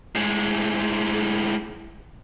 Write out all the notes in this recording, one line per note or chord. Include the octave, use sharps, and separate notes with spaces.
A2 G#3